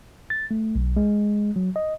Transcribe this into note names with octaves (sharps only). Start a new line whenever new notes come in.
A6
A3
B1
G#3
F#3
D#5